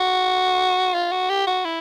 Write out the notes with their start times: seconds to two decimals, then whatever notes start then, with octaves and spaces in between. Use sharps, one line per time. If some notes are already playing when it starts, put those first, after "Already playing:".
Already playing: F#4
0.94 F4
1.12 F#4
1.30 G4
1.47 F#4
1.65 E4